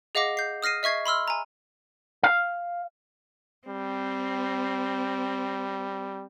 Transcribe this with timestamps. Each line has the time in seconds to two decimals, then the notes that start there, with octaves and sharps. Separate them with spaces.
0.15 G#4 D#5 F5 F#5 D6 A#6
0.37 G6 C7
0.62 D#6 F6 A#6 C7 D#7
0.83 D#5 E5 C#6 G#6 C7
1.06 B5 C6 E6 F6
1.28 G#5 A#5
2.23 F5
3.68 G3 C4